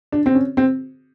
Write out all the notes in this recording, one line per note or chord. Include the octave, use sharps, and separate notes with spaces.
D4
C4
C#4
C4